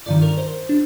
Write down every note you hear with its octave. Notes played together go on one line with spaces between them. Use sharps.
G1 G2 D#3 D5
A#4
C5
D4